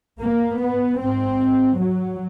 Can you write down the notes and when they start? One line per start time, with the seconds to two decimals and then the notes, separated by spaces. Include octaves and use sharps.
0.20 A#3
0.60 B3
0.99 G#2 C4
1.79 F#3